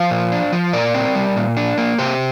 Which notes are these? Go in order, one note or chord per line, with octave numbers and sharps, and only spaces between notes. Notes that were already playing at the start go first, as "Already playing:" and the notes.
Already playing: F3 C5 F5
A#2
D4
F3
A#2 A#4 D5
C4
G3
A#2
D4
A#3
C3 G4 C5